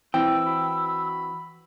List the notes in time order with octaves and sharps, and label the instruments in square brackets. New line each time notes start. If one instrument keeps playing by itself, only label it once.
[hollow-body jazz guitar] E3 C4 [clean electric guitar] G5 [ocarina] E6
[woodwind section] F#4 B5